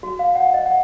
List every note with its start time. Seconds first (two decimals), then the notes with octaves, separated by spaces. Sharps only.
0.03 F#4
0.19 F5
0.35 F#5
0.54 D#5
0.66 F#5